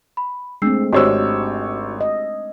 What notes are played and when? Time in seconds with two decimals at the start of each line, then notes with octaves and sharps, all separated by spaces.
0.17 B5
0.62 G#3 A3 C4 D4 E6 C7
0.93 G#1 D4 F#4 G4 C5 C#5 D#5 E6
2.01 D#5